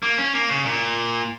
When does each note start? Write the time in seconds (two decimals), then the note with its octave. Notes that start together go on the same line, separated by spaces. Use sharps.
0.03 A#3
0.18 C#4
0.34 A#3
0.49 C#3
0.66 A#2